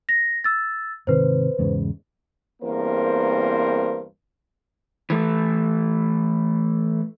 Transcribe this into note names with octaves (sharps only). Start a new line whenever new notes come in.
A#6
E6 A6
G#2 C3 D#3 B4 C5
E2 G#2 C#3
E2 G2 A#3 C4 A#4 C5
E3 A3